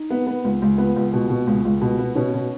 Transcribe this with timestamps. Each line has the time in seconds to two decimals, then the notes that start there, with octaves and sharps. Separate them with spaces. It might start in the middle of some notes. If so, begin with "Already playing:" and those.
Already playing: D#4
0.10 B3
0.27 B3
0.44 C#2
0.62 C#2
0.78 B3
0.96 C#2
1.13 B2
1.29 B2
1.47 C#2
1.65 C#2
1.81 B2
1.99 B3
2.15 B2 C#4
2.34 B2